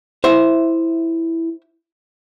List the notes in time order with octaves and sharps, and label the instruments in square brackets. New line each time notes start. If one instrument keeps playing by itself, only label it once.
[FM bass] E4 [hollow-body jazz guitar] C5 E5